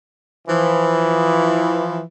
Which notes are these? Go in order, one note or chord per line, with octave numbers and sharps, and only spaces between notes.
E3 F3